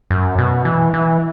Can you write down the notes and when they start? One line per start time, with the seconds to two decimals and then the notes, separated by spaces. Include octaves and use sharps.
0.10 F#2
0.38 B2
0.65 E3
0.94 E3